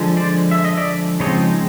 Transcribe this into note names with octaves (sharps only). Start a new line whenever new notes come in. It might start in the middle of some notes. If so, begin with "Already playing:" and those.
Already playing: D3 F3 G#3
C5 D5
E5
D#5
D5 E5
C#3 F3 G#3 C4 D#4 C#5 D#5